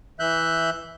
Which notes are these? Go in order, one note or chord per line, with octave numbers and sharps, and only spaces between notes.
E3 E5 F#6 G6